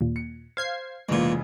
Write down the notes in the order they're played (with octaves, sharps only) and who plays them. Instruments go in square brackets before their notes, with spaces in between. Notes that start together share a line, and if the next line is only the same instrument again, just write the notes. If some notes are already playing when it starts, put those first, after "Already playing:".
[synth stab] D#2 A#2
[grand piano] C#7
[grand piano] C5 [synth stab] F5 G#6 C7
[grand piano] F1 C#3 G#3 [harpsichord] E2 A#2